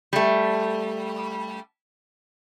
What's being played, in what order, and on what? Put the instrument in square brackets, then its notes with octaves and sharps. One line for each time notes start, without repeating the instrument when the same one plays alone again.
[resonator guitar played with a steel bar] G3 A3